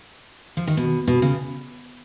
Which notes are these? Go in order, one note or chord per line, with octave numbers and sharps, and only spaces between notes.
F3
D#3
B2
B2
C#3